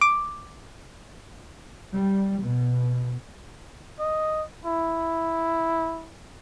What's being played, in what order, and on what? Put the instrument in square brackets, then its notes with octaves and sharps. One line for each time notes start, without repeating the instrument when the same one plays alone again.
[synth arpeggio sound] D6
[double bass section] G3
B2
[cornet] D#5
E4